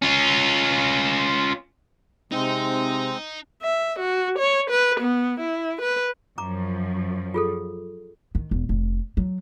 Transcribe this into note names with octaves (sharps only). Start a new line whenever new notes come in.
C#4 F4
C3 G#3 C4 D#4
E5
F#4
C#5
B4
B3
E4
B4
F#2 F3 A#5 D6
F4 G#4 A4
D#3
E1
F1
F#3